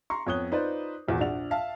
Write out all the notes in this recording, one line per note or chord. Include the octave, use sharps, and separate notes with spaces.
A#5 C6 C#6
F2 B3 C#5 D#6 F#6 G7
D#4 F4 B4 C5 D5
G#1 E2 A#2 F#4
A#1 D4 D5 F#5 F7
E5 F5 A5